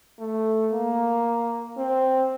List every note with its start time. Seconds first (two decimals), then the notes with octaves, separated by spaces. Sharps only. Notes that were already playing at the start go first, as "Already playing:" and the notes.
0.19 A3
0.72 A#3
1.77 C4